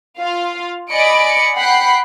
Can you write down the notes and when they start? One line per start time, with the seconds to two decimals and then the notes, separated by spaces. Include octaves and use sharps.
0.19 F4 F5
0.91 D5 D#5 G#5 B5 C#7 D7
1.57 F#5 G5 B5 F#6 C7